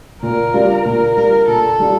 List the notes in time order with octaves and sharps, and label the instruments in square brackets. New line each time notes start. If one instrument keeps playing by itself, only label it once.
[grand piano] A#2 [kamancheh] A#4
[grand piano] G3 D4 F4
[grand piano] A#2 [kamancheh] A#4
[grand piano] G3 D4 F4 [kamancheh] A#4
[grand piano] A#2 [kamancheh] A4
[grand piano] G3 D4 F4